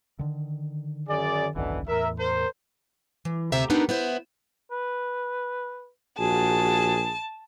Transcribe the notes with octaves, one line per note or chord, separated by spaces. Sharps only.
D3 D#3
F#2 G#4 D5
G#1 C#2 F#2 B2 D3 E3
E2 A2 A#4 E5
A#4 C5
E3
D2 C3 G4 C5 E5 A#5
B3 D4 D#4 G4 A#4
B3 E4 C5
B4
A#1 F#4 G#4 A5